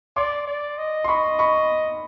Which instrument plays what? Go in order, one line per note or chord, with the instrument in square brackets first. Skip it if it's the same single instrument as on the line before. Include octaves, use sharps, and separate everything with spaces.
[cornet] D5 [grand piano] C6 D6
[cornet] D5
D#5
[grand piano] C6
[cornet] D#5 [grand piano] B5 C#6
[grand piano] B5 C#6